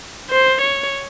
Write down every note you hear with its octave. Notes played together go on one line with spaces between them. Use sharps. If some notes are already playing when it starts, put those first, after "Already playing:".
C5
C#5